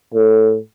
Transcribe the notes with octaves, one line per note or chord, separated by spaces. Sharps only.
A2